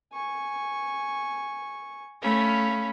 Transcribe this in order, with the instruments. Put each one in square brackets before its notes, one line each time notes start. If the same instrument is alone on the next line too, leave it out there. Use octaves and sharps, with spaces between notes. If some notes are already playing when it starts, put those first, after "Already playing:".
[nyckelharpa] G#5 C#6
[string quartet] A3 C#4 [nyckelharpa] F5 B5